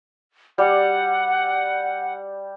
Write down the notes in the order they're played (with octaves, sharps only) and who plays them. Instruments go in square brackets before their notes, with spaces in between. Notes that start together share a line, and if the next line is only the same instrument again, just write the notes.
[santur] G3 [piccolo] F#5